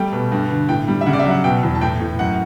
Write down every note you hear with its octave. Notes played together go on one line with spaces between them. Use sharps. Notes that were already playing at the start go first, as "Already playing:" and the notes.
Already playing: G3 A3 G5
B2
G2
D3
A2 G5
G3
E5
C#3 F#5
D5
E5
F#3
F#5
B2 G5
E2
A5
A2 G5
A2
F#2 F#5